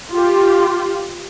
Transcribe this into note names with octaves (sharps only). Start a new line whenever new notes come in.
F4 G4